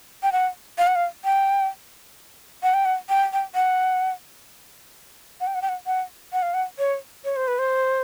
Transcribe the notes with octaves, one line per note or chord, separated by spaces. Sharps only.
G5
F#5
F5
F#5
F5
G5
F#5
G5
F#5
G5
G5
F#5
F#5
G5
F#5
G5
F#5
F#5
F#5
F5
F#5
C#5
C#5
C5
B4
C5